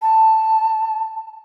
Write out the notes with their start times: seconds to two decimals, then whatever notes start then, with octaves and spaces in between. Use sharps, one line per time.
0.02 A5